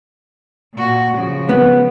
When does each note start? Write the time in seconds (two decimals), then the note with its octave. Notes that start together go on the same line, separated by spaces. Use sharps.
0.74 A#2 F#4
1.14 C#3 F3
1.49 B3